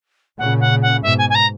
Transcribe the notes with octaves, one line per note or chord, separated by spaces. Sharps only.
A#2 C#3 F#5
F#5
F#5
G#2 B2 E5
G#5
G#5
A#5